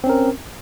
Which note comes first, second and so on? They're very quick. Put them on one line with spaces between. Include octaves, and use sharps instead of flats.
C4 C#4 A#4